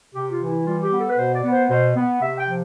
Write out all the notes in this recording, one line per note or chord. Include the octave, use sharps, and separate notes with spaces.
C3 G4
F4
E3
E4
G3 F4
G4
B3
A4
B4
B2 C5
D5
B3
C5
B2 C5
B3
C3 E5
G5
F3